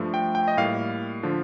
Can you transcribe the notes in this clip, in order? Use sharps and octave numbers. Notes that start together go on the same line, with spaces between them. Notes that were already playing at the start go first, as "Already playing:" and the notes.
Already playing: G2 F3 A3
G5
G5
D#5
A2 G3 A#3 F5
D3 F3